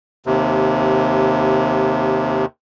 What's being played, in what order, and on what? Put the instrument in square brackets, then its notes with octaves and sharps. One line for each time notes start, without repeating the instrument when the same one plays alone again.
[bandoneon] D#2 C3